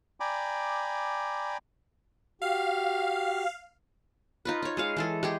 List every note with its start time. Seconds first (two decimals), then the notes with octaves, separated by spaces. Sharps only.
0.20 D5 G5 G#5 A#5 B5 D6
2.42 F#4 G4 F5
4.45 D#4 F4 B4
4.62 D#4 C#5
4.77 G#3 G#4 F5
4.97 E3 G#3 A4
5.23 G#3 G4 G#4